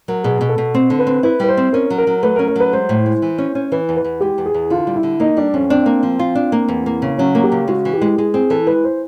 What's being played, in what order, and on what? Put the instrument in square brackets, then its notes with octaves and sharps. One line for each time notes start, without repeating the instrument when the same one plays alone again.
[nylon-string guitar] F#3 [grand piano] A#4
[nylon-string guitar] B2 [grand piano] G#4
[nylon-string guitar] B2
[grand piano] A4
[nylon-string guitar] B2
C4
D3
[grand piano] B4
[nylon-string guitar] C4
[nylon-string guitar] E4 [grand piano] B4
[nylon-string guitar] G3 [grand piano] B4
[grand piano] C5
[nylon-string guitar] C4
[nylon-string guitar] C#4 [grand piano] A#4
[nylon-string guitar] F#3
[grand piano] A#4
[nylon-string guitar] F#3
[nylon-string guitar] A3 [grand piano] B4
[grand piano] A#4
[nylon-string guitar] C#4
[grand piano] A#4
[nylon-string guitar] F#3 [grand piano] B4
[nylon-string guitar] G#3 [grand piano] C5
[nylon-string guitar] A2
G#3
E3
C#4
C#4
[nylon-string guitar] E3 [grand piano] B4
[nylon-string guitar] E2
[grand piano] B4
[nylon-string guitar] E2
[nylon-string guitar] G#3 [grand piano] G4
[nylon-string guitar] E2
[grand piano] G#4
[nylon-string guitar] E2
[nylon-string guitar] D3 [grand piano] F4
[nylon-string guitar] G3
[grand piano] E4
[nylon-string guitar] D3
[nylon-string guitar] A#3 [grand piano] D#4
[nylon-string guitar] G3 [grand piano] D4
[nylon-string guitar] F2 [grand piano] C#4
[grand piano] C4 [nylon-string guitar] D4
[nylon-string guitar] A#3
F3
F4
D4
A#3
E2
A#3
C#3
[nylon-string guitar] F#3 [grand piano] C#4
[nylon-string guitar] A#3
[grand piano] G4
[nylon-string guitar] C#3
[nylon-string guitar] G#3 [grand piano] F#4
[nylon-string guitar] E3
[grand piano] G4
[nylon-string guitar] G#3
[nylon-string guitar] G#3 [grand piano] G#4
[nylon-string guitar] C4 [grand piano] G#4
[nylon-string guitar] E3 [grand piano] A4
[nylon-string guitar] G#3 [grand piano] B4
[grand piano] C5